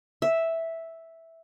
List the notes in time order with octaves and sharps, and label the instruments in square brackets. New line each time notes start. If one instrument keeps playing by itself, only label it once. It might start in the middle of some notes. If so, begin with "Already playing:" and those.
[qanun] E5